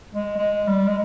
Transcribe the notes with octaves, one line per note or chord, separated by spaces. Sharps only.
G#3
G#3
G3
G#3